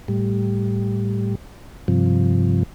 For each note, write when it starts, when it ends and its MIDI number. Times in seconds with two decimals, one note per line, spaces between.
0.08 1.35 45
0.08 1.35 55
1.88 2.63 43
1.88 2.63 48
1.88 2.63 53